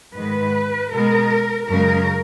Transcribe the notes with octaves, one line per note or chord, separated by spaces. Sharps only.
G#2 D#3 G#3 B4
B2 G#3 B3 A#4
F#2 C#3 G#3 A#4